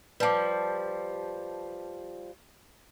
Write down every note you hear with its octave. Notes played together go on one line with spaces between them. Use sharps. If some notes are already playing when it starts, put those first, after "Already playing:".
F3 G3 B4 A5 D6